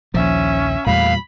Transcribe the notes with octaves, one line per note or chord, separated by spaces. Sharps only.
A#1 D#2 F3 C#4 E5
E2 A#2 G3 A3 F5 B5